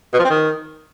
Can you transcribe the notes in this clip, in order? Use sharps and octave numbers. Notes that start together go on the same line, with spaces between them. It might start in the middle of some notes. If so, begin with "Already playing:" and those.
B2
F3
C4
D#3